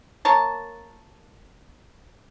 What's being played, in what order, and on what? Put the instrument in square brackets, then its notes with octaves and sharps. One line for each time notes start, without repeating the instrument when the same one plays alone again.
[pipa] A#3 A#4 C#5 A5